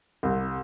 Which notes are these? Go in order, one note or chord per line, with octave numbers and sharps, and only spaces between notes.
C2